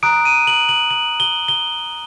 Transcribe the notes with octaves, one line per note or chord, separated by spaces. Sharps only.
A#5 D#6 F#6 D7
D#7
F#7
F#7
F#7
G7
G7